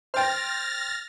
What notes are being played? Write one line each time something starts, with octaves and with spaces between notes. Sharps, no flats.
C5 G5 F6 A6 A#6